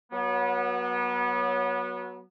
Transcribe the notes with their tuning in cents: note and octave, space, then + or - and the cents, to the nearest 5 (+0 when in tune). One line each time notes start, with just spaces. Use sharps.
F#3 +0 B3 -30